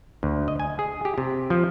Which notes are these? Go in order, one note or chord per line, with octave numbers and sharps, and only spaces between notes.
D2
D#5
G#5
G#4
G4
C3
F3